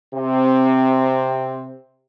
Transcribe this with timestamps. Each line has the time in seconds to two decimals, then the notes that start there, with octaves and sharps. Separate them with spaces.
0.14 C3 C4